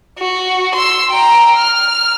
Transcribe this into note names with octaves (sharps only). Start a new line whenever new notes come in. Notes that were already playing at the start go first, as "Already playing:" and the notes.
F#4
C6 E6
G5 A#5
F6